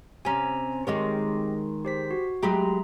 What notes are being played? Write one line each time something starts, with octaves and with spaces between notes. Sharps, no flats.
C3 C#4 G#5 A#5
D#3 G#3 C4 G4 C#5 D#5
G4 C5 B6
F#4
F#3 G#3 A3 G4 A#5 B5